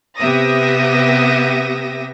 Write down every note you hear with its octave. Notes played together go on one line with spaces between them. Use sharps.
C3 B3 G4 E5 D#6 A#6